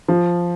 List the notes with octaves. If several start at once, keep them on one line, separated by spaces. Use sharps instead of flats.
F3